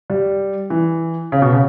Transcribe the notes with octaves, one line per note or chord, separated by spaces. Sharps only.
G3
E3
C#3
B2
C#3